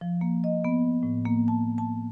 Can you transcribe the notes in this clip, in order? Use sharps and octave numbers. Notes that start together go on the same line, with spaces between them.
F3
A#3
D#5
B3
A2
A#3
A5
A5